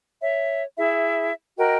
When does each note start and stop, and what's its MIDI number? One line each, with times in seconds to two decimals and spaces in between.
0.21 0.63 73
0.21 0.63 76
0.77 1.31 64
0.77 1.31 68
0.77 1.31 76
1.58 1.77 66
1.58 1.77 70
1.58 1.77 75
1.58 1.77 79